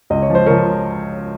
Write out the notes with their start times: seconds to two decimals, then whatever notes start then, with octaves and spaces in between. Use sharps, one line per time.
0.10 C#2 D#5
0.22 C#5
0.30 F3 C5
0.46 F3 A#4 C#5